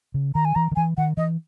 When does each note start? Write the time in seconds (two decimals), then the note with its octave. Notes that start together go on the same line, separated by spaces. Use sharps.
0.14 C#3
0.35 D#3 A#5
0.45 G#5
0.55 E3 A#5
0.71 D#3
0.76 E3 G#5
0.97 D#3 F#5
1.17 E3 D#5